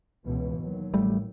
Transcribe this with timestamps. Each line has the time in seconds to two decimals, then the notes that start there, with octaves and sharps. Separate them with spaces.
0.24 C#2 B2 E3
0.59 D#2 F#3
0.94 A1 G3 A3